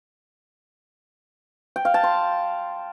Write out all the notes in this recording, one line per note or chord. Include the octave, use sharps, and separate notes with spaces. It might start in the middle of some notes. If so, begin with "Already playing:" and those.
G5
F5
A5
C6